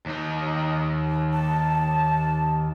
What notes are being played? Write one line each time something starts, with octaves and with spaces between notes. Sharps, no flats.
D#2 D#4
A5